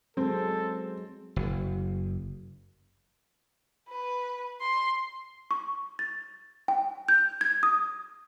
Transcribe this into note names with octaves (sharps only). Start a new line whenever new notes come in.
F#3 G#3 C4 G#4 A4
F#1
B4
C6
C#6
A6
G5
G6
G#6
D#6